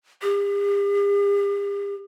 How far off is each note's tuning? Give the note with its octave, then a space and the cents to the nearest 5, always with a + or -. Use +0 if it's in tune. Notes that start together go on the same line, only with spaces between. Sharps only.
G4 +45